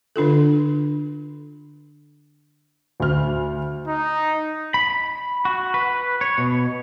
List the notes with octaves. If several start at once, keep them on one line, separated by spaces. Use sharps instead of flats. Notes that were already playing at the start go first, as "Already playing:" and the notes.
D3 D4 F4 A4
D2 F6
D#4
B5
F#4
B4
C#5
B2